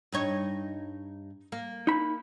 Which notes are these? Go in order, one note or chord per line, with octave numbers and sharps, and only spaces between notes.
G2 D#4 C#5
A#3
D#4 B5